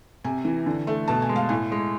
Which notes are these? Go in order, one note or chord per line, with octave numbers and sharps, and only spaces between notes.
C3 G#5
E3
D3
A3
B2 A5
G#5
G#3
F5
A2 G#5
G#3